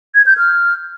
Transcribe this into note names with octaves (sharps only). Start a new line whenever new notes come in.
G#6
G6
F6